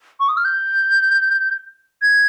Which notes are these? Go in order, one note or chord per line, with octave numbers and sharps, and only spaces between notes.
C#6
D#6
F6
G6
G#6